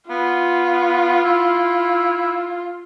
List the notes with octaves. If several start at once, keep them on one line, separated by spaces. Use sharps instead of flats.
B3 F4
E4